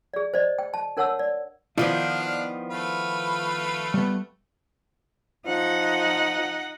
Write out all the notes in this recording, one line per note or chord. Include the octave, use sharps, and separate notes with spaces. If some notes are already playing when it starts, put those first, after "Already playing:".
G#4 D5
C5 D5 D#5
G5
A5
D4 A#4 C#5 F#5 A5 E6
D5
D#3 F3 B3 D4 E4 F4 D5 F5
A3 B4 F5
G3 B3
F3 D#4 F#5